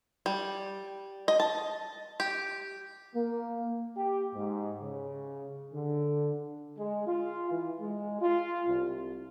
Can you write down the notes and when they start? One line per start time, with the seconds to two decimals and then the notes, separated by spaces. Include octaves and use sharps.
0.26 G3
1.28 D#5
1.40 A5
2.20 G4
3.15 A#3
3.96 G4
4.34 G#2
4.81 C#3
5.73 D3
6.78 G#3
7.07 F4
7.51 E3
7.81 G#3
8.21 F4
8.68 C2